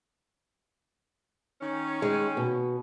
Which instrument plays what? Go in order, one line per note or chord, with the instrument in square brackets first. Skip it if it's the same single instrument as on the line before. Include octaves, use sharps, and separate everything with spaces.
[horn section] D#3 C#4 C#5
[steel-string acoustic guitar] G#3
B2